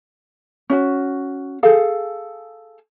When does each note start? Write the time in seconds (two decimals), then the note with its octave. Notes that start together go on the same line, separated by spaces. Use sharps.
0.70 C#4 F4 F#4
1.63 G#4 A4 F5